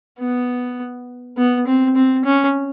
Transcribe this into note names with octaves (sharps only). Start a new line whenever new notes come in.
B3
B3
C4
C4
C#4